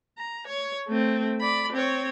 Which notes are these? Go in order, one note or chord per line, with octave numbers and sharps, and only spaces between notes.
A#5
C#5
A3 C4
D5 B5
C4 C#5